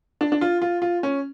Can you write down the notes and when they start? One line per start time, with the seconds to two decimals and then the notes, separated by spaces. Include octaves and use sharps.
0.21 D4
0.32 D4
0.41 F4
0.62 F4
0.82 F4
1.03 C#4